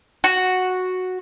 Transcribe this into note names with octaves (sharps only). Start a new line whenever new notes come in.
F#4